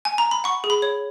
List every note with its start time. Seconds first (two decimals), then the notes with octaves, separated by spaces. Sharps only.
0.05 G#5
0.18 A#5
0.31 B5
0.44 F#5 C#6
0.64 G#4
0.70 B5
0.82 C#5